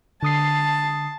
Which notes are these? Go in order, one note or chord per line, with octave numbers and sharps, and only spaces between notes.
D3 A5 D#6 C7